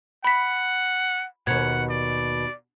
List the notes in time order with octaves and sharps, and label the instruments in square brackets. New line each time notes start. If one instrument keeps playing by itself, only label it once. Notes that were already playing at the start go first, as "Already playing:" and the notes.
[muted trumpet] F#5 [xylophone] B5 B6
[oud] D#2 B2 [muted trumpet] F#5 [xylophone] G#6
[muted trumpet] D5